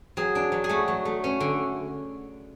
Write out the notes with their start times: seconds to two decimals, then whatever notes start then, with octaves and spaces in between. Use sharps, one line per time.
0.17 F#3 G#4
0.35 D4
0.52 F#3
0.64 G#4
0.69 A3 F#4
0.88 F#3
1.05 A3
1.24 C#4
1.40 D3